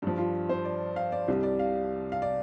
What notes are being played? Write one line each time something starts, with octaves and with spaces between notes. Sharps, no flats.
G2 F3 D4
F4
C5
D5
F5
D5
C2 C3 G3
D5
F5
F5
D5